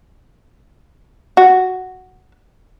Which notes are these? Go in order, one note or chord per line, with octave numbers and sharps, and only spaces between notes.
F#4